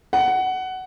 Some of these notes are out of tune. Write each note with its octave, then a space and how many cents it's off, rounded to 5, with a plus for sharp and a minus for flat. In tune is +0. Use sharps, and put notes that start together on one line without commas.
F#5 +15